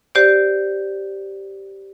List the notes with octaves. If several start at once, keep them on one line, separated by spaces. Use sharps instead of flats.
G4 C5 D5